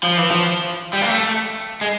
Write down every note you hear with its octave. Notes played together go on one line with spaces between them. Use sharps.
F3
E3
F3
G3
A#3
A3
G#3